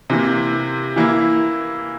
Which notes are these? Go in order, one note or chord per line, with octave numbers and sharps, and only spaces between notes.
C3 E3 A#3
E3 A#3 E4